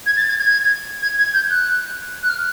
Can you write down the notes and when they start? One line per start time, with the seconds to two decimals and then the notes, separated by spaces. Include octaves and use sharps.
0.06 G#6
0.17 A6
0.28 G#6
0.38 G#6
1.02 G#6
1.18 G#6
1.34 G6
1.50 F#6
2.22 F#6
2.29 F6